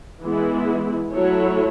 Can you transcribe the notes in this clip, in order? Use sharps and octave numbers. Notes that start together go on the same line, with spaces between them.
E3 G#3 B3 E4
F#3 A3 E4 A4 C#5